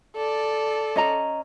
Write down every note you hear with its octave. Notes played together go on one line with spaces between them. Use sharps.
A4 D5
C#4 D#5 A#5